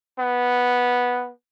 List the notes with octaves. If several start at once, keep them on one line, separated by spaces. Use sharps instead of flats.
B3